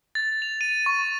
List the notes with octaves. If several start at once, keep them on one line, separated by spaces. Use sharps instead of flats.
A6
F7
D#7
C#6